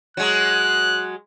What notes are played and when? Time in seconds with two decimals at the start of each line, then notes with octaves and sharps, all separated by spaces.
0.17 F#3 G#3 F#6